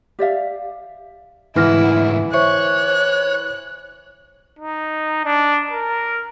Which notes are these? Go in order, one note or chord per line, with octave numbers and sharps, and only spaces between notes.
G4 D5 E5 F5
D2 G#2 E3 E4 B4 F6 A#6
C5 C#5 E5 C#6 F#6
D#4
D4
A#4